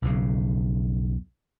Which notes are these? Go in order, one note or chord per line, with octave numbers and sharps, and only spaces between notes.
B1 F2 C#3